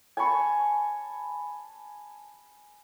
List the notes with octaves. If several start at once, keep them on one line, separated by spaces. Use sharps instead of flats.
G#5 A5 B5 C#6